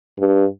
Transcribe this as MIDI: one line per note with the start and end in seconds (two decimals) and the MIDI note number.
0.19 0.45 43